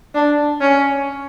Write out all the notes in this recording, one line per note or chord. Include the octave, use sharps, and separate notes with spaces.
D4
C#4